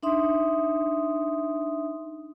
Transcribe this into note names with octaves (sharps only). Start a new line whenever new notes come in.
D4 D#4 E5 C6 D#6